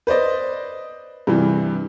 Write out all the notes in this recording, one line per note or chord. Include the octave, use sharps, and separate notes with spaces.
B4 C5 D5 D#5
G2 C3 E3